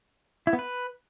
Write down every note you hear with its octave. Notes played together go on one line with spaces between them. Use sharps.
E4
B3
B4